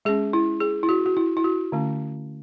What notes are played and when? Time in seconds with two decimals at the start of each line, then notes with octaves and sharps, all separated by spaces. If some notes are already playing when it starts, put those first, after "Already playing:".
0.05 G#3 C#4 G#4
0.33 E4
0.61 G#4
0.83 E4
0.89 F#4
1.06 F#4
1.17 E4
1.37 E4
1.44 F#4
1.72 D3 A3 C#4